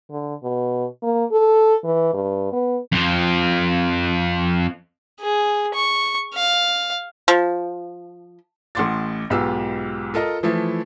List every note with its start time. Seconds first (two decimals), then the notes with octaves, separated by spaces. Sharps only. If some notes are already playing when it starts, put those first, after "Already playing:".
0.10 D3
0.43 B2
1.03 A#3
1.32 A4
1.84 E3
2.14 G2
2.53 B3
2.92 F2 F3
5.20 G#4
5.74 C#6
6.34 F5
7.28 F3
8.75 A1 A2 F#5 C6 D6 A6
9.30 B1 G#2 B3 F4 G4 E6
10.14 F4 A4 A#4 D#5
10.43 E3 F3 A3 E4